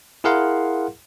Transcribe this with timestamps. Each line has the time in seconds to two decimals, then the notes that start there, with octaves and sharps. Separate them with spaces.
0.24 E4 G#4 A#4 F5 F#5 C6